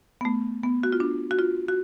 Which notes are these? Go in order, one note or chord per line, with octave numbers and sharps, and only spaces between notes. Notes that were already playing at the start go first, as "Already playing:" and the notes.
B3
A3
B3
F#4
F4
D4
F#4
F4
F#4